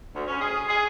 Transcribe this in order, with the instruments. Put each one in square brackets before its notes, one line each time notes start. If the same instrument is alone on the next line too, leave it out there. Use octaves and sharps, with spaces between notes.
[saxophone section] D2
C#4
G#4
G#4